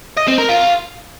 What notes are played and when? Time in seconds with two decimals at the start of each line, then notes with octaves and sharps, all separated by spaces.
0.17 D#5
0.28 C4
0.38 A#4
0.49 F4